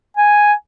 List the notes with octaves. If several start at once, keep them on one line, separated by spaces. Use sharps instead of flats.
G#5